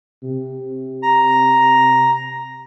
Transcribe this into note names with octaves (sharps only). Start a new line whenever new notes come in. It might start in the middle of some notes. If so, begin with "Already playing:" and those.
C3
A#5